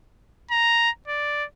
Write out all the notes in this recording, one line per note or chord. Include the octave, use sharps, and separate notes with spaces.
A#5
D5